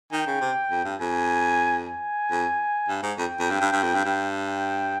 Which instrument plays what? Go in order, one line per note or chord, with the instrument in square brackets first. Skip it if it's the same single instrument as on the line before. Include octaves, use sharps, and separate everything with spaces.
[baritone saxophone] D#3 [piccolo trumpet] G5
[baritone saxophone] C#3
C3
F2
G2
[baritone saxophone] F2 [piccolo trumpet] G#5
[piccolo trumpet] G#5
[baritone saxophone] F2
G2
G#2
[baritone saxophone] F2 [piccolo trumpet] G5
[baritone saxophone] F2
G2
G2
G2
F2
G2
G2
[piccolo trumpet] G5